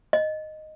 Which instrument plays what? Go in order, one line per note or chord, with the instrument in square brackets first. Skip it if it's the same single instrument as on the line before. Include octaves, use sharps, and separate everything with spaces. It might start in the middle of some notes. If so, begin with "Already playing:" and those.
[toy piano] D#5